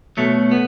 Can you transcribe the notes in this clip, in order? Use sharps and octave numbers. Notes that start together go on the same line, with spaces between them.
B2 F#3 A3
B3